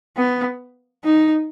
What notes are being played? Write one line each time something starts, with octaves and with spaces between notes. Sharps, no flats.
B3
D#4